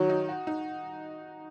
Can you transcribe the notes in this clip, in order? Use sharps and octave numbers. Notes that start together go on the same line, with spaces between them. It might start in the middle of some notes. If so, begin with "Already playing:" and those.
Already playing: D#3 F#3
D#4
F#4
D#4